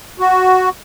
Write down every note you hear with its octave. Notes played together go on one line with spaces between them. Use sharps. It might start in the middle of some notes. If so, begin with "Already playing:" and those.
F#4